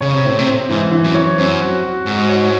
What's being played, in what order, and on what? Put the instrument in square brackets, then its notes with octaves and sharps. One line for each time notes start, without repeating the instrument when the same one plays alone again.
[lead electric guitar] C#3 [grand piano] C#5
[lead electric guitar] C3
[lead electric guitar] A2 [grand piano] C4
[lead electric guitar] C3
[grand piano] C4
[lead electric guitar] G#2 [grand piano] E3
[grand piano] E3
[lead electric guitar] F#2
[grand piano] C#5
[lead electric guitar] F#2 [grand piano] C4
[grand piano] F#4
F#4
[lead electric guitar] G#2 [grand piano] F#4
[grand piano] C#5